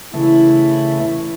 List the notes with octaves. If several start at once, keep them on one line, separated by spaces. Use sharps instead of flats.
C#3 E3 A3 E4